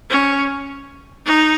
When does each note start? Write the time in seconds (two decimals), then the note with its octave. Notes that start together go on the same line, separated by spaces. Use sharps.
0.10 C#4
1.26 D#4